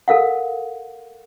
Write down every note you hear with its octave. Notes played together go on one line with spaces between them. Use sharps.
A4 A#4 F5 F#5